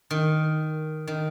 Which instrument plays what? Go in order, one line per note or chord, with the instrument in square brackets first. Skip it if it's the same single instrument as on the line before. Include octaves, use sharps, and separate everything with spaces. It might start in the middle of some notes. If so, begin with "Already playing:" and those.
[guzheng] D#3
D#3